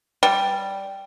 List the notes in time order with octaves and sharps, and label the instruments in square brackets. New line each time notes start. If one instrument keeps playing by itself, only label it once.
[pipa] G3